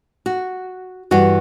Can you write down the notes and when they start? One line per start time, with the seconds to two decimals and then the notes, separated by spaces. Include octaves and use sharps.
0.26 F#4
1.11 G2 E3 F#4